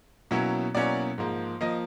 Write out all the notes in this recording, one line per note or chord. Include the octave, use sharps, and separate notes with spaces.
B2 F#3 A#3 C#4 E4
B2 F#3 A#3 C#4 E4 D5
G#2 F3 A#3
F3 A#3 D#5